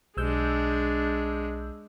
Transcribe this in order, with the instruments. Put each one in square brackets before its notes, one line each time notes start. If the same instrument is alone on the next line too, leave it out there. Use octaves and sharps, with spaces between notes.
[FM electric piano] B1 E6 G6 [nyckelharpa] G#3 D4